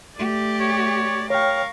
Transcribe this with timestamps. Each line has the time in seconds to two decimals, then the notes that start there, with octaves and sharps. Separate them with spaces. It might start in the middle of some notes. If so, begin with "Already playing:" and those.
0.17 A3 G4 D5
0.60 C#5
1.30 A#4 C#5 F5 G5 C#6